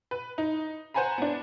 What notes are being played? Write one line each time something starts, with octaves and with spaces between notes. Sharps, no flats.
B4
D#4
B4 C5 F#5 G#5 A#5 B5
B3 D4